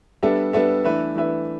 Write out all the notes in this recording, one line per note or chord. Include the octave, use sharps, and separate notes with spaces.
G3 B3 D4 A4 E5
G3 B3 D4 A4 E5
E3 A3 D4 B4 E5
E3 A3 D4 B4 E5